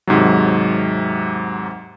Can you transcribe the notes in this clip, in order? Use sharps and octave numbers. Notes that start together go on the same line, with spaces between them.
D#2 G#2 C3 F#3